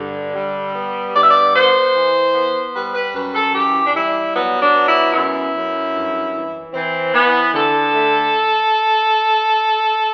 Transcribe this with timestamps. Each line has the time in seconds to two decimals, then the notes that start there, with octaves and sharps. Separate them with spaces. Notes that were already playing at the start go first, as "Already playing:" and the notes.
Already playing: G2 D3
0.35 G3
0.74 B3
1.14 G2 D5
1.23 E5
1.31 D5
1.55 B3 C5
1.95 E3
2.34 B3
2.74 G3 B4
2.94 B4
3.14 F#2 B4
3.34 A4
3.54 E3 G4
3.85 D4
3.95 G3 E4
4.34 F#3 B3
4.61 D4
4.74 B3
4.87 E4
5.14 F#2 E4
5.54 F#2
5.94 G2
6.34 E3
6.73 E3 C4
7.14 E3 B3
7.53 D3 A4
7.94 A3